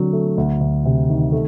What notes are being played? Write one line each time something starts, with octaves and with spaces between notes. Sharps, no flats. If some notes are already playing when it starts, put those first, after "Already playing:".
Already playing: D3 F#3 C4
A3
D2
D2
C3
D#3
A3